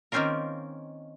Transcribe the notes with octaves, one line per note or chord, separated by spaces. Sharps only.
D#3 A#3 C4 C#4 F4 A#4